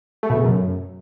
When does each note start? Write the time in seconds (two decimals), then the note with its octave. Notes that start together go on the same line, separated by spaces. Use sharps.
0.23 A3
0.30 B2
0.37 C#3
0.44 F#2